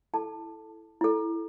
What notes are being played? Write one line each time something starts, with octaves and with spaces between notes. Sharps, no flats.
E4 A4 A5
E4 A4